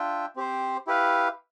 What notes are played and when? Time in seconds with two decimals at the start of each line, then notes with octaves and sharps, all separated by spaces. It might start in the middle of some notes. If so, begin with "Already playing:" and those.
Already playing: D4 F4 E5 G5
0.36 C4 G4 C5
0.87 E4 G4 B4 F5